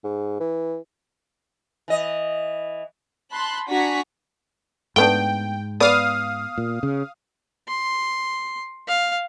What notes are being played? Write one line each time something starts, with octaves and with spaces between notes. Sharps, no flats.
G#2
E3
E3 D#5
A5 B5 C6 F#6
D4 F#4 G#5 A#5 C#6 B6
G#2 A3 B3 D4 G5
B3 D5 F5 D#6
A#2
C#3
C6
F5